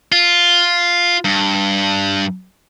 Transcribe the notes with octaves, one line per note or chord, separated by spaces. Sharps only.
F4
G2